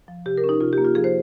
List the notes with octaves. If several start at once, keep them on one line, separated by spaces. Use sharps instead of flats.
F3
C3 G4
A#4
C#4
D#4
C3 F4
G4
A#3
F4
F3 G#4
C5